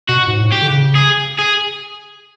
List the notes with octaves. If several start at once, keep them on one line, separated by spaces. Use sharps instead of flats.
B2 F#4
G#2
A2
G4
D3
C#3
G#4
G#4